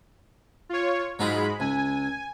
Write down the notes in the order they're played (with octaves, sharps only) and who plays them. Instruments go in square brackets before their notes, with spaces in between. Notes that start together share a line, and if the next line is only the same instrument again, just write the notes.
[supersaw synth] F4 C#5
[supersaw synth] G#2 G#3 B5 [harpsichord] F#3 D#4 F4
[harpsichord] C#2 [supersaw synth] G#5